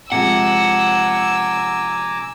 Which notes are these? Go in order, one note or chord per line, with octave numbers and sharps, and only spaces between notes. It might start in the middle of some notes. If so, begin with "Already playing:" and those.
C3 F3 G#3 F#5 G#5 A#5 D6 E6